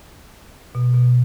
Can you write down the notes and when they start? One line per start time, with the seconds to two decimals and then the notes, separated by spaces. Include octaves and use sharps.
0.75 B2
0.94 B2